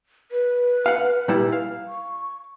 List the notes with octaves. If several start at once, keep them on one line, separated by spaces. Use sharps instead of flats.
B4
F5 F#5
A#2 G3 E4
F5
C#6